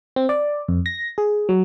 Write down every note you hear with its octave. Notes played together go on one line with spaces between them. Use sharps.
C4
D5
F2
A#6
G#4
F#3